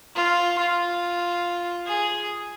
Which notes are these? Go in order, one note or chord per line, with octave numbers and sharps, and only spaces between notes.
F4
F4
G#4